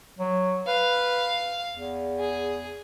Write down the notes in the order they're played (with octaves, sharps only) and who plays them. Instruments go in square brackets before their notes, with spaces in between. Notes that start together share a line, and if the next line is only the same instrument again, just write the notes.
[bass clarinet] F#3
[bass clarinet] B4 [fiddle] F5
[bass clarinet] E2
[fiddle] G#4